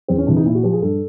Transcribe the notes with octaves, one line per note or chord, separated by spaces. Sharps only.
E2 C4
C#4
C3 E3 D4
D#4
A#2 E4
F#4
F3 G4
G#4
G2 A4